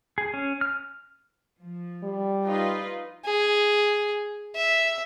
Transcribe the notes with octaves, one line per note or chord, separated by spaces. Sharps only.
G#4
C#4
F6
F3
G3
D#4 F4 B4
G#4
E5